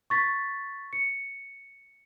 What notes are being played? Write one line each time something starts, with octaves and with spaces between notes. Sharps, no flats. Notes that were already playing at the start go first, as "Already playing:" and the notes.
C#6 A6 B6
C#7